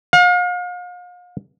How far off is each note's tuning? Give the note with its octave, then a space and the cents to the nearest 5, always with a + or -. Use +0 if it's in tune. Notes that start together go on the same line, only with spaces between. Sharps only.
F5 +40